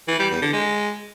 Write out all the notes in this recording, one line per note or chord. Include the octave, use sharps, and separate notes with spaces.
E3
G3
E2
D3
G#3